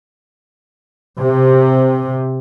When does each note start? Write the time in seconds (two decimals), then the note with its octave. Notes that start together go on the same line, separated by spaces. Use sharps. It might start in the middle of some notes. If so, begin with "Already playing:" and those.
1.19 C3